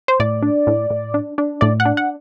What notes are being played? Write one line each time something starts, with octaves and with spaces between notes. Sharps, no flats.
C5
A2 D5
D4
A2
A2
D4
D4
A2 D5
F#5
D4
F#5